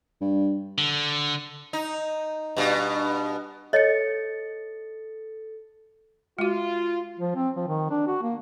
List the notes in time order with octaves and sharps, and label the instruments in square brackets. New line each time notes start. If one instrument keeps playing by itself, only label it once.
[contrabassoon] G2
[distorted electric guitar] D3
[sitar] D#4
G2 B2
[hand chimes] A4 A6 C#7 [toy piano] C#5 D#5
[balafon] G#3 F#4 [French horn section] F4
[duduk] F3
C4
F3
D#3
D4
F#4
A#3